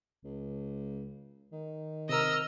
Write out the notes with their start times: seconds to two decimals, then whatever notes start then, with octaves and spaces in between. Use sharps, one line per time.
0.24 C#2
1.52 D#3
2.09 C3 A#4 D#5 E6 F6